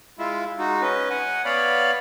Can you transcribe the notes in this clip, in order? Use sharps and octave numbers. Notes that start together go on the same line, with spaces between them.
G#3 E4 F4
G#3 D#4 F#4
C#4 B4 D#5
F#5 G#5
B3 C#5 D5 F5 B5